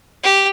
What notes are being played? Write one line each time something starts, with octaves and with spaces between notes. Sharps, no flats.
G4